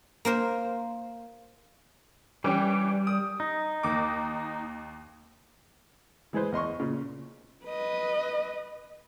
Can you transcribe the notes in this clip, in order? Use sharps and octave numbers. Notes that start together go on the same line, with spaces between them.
A#3 A#4 C5
E3 G3 C#4 G4
D#6
D#4
D#2 D6
E3 G#3 G#4 B4 C5
E2 D#5 C6 C#6
A#2 C#3
B4 D#5